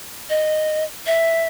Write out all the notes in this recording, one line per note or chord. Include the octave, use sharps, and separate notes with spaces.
D#5
E5